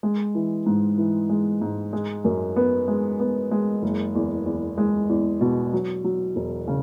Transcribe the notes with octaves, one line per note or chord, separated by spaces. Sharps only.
G#3
E3
G#2
E3
G#3
G#2
G#3
F#2
B3
G#3
B3
G#3
F#1
E2
E2
G#3
E2
B2
F#3
F#3
E1
C#3